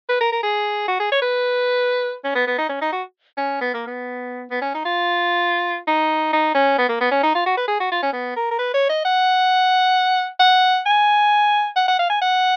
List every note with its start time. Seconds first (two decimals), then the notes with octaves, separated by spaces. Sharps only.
0.09 B4
0.21 A#4
0.32 A#4
0.43 G#4
0.88 F#4
1.00 G#4
1.12 C#5
1.22 B4
2.24 C#4
2.35 B3
2.47 B3
2.58 D#4
2.69 C#4
2.82 D#4
2.92 F#4
3.37 C#4
3.61 B3
3.74 A#3
3.87 B3
4.50 B3
4.62 C#4
4.74 D#4
4.85 F4
5.88 D#4
6.33 D#4
6.54 C#4
6.78 B3
6.89 A#3
7.01 B3
7.11 C#4
7.23 D#4
7.35 F4
7.46 F#4
7.57 B4
7.68 G#4
7.80 F#4
7.91 F4
8.03 C#4
8.13 B3
8.36 A#4
8.51 A#4
8.59 B4
8.74 C#5
8.89 D#5
9.05 F#5
10.40 F#5
10.86 G#5
11.76 F#5
11.88 F#5
11.99 F5
12.10 G#5
12.22 F#5